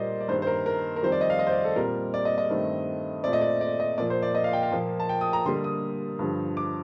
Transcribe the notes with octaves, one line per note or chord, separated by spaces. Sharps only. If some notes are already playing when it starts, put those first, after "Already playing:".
Already playing: A#2 G3 A#3 C5 D5 D#5
D5
G2 D#3 A#3 C5
C5
A#4
A#4
A#4
F2 D#3 G3 C5
D5
D#5
F5
D#5
C5
D5
A4
A#2 G3 C4 A#4
D5
D#5
D#5
G2 D#3 A3 C4
A#2 A3 C4 D5
D#5
D5
D5
D#5
A#2 F3 A#3 D5
C5
D5
D#5
F5
G5
F5
A#2 F3 A#3
A5
G5
D#6
A#5
D3 G3 A#3 C6
D#6
G2 D3 F3
D6